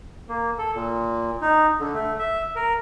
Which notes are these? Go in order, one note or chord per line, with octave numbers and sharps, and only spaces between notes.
A#3
A4
A#2
D#4
D3
A3
E5
A#4